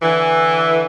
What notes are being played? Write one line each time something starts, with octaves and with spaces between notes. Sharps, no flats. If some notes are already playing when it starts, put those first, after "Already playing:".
D3 E3